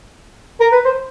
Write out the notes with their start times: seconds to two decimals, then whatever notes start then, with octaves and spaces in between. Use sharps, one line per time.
0.60 A#4
0.72 B4
0.85 C5